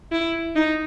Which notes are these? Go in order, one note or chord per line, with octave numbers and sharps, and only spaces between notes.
E4
D#4